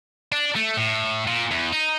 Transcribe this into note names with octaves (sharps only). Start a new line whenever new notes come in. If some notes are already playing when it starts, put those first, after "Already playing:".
D4
A3
A2
A#2
E2
D#4